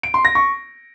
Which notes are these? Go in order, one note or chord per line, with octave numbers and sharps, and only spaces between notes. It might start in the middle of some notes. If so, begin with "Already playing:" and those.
D7
C6
A#6
C#6